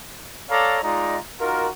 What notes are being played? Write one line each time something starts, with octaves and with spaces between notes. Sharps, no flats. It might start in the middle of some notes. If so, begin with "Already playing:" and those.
A4 C#5 D5 F5 A#5 D6
G#3 D#4 F4 D5 A#5
D#4 F4 F#4 A#4